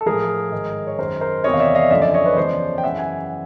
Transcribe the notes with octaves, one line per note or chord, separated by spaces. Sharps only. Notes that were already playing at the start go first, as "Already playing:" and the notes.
A4
A2 F3 G#4 A#4
G#2 D#3
C#5
F#2 D#3 A#4 C5
A#4 C5
E2 C3 D#3 C#5 D#5
F5
D5 E5
D#5 F5
F#2 D3 F3 D5 E5
D5 E5
C#5 D#5
B4 C#5
E2 C#3 F3 C5 D5
G5
F#2 C#3 E3 E5 F#5
F#5 G#5